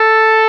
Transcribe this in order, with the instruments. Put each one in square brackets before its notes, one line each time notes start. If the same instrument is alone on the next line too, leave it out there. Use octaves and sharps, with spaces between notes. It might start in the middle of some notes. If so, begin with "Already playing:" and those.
Already playing: [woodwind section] A4